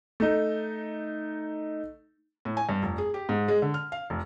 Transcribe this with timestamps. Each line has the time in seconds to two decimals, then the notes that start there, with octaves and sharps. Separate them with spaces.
0.20 A3 D#4
2.45 A2
2.57 G#5
2.69 G2
2.83 F1
2.98 G#4
3.14 G4
3.29 G#2
3.48 G#3
3.62 D3
3.74 F6
3.92 F5
4.10 F1